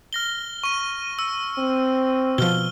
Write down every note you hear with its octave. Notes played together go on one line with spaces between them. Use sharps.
F6 A#6 G7
C#6 D#7
E6
C4
B2 F3 F6 G7